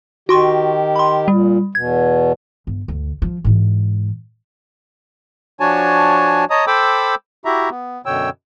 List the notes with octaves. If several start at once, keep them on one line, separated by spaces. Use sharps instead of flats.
D#3 F#4 G4 C6 C#6
B5 C6
A#2 G3
E2 B2 G#6
G1
D2
F3
G#2 E3
F3 D4 F#4 C#5 G#5 A5
C#5 D#5 A5 A#5 D#6
A4 C5 G5 B5 D6 E6
E4 F#4 G4 E5 A#5
B3
F#2 B2 D3 C#5 G5 E6